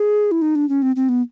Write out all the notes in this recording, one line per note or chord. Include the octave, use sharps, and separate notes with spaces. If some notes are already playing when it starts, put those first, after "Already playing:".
Already playing: G#4
E4
D#4
D4
C#4
C4
C4
B3